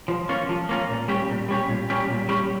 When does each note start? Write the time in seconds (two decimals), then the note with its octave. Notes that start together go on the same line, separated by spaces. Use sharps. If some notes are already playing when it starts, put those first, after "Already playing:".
0.08 F3
0.29 A#3 C#4 F4
0.49 F3
0.69 A#3 C#4 F4
0.89 A#2
1.08 G3 C#4 G4
1.29 A#2
1.49 G3 C#4 G4
1.69 A#2
1.90 G3 C#4 G4
2.10 A#2
2.29 G3 C#4 G4